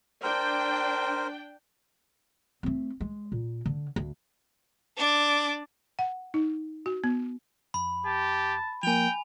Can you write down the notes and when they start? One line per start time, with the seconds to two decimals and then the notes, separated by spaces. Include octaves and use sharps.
0.23 D4 A#4 C5 G5
2.63 A3 C4
3.01 G#3
3.32 A#2
3.66 D3
3.96 D2
4.97 D4 D5
5.99 F#5
6.34 D#4
6.86 F#4
7.04 B3
7.74 F2 B5
8.06 G4 A5
8.83 F3 A#3 G5 G#5 F7